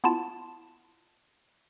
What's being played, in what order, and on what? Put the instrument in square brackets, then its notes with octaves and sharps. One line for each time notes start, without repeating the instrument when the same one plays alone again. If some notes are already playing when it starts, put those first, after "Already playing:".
[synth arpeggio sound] B3 E4 F4 A5